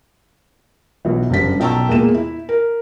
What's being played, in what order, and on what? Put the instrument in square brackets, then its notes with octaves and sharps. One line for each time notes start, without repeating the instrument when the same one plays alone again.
[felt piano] B1 E3
F#1 G2 B6
B1 G5 A5 A#5 C#6 E6
E2 A#2 G#3 A#3 E7
E4
A#4